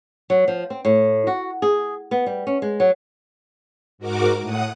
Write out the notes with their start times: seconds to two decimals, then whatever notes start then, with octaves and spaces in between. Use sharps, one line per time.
0.30 F#3
0.48 F3
0.70 C4
0.85 A2
1.27 F#4
1.62 G#4
2.11 B3
2.26 G3
2.47 C#4
2.62 G#3
2.80 F#3
3.98 G#2 F#4 A#4 D6
4.41 A2 F#5 D#6